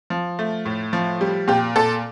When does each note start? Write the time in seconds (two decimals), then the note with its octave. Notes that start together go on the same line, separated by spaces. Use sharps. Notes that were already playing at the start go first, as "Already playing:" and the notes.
0.10 F3
0.39 A3
0.65 A2
0.93 F3
1.21 G3
1.48 A#2 G4
1.76 A#2 A4